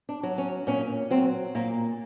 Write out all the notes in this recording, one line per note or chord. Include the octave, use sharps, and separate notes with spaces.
D4
F#3
C#4
A#2 C#4
F#3 C4
A#2 A#3